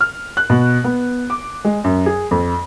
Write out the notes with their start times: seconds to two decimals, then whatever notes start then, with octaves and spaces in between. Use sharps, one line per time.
0.01 F6
0.37 F#6
0.50 B2
0.84 B3
1.30 D6
1.65 G#3
1.84 F#2
2.06 G#4
2.31 F2